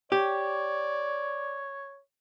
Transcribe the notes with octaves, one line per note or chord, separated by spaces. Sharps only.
G4 C#5 D5